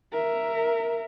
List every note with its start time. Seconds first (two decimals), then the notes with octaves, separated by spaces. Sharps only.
0.12 A#4 E5